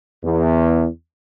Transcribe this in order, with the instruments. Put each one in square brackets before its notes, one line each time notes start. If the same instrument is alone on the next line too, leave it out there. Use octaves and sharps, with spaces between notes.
[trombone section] E2